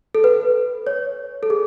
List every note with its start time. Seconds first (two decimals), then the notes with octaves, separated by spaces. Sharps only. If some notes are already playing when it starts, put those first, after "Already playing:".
0.15 A4
0.24 B4
0.87 C#5
1.43 A4
1.50 G#4